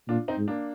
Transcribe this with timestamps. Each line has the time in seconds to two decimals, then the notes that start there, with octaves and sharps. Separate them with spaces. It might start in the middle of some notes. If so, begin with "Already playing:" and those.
0.08 A#2 D4 F4
0.28 C4 D#4
0.37 G#2
0.48 A#3 D4